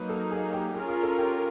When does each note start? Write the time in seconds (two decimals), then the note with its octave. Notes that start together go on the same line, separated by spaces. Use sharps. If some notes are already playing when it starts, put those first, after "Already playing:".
Already playing: F#3 A#3 D#4 B4
0.10 A4
0.31 G#4
0.53 G4
0.74 C#4 F4 G#4 A#4
0.89 G#4
1.03 A4
1.18 G4